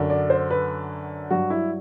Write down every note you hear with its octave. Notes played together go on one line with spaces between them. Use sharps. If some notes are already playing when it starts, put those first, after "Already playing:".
Already playing: F#2 D3 F#3
D5
C5
B4
G2 F#3 F#4
E4